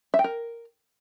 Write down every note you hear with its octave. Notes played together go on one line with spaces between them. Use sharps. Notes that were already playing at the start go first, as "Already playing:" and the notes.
E5
G5
A#4